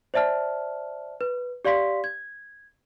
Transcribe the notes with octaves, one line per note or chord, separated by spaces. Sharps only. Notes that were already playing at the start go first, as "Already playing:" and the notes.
C5 D5 E5 A5 F6
B4
G4 D5 F5 C6 B6
G#6